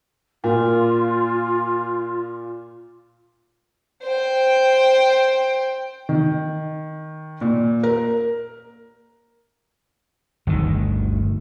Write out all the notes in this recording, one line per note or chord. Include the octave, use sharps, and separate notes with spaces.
A#2 F4
C5 G5
D#3
A#2
A#4
G1 D2 D#3